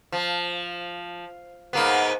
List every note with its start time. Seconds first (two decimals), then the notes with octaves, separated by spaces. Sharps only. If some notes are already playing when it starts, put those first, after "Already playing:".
0.12 F3
1.73 G#2 A#3 B3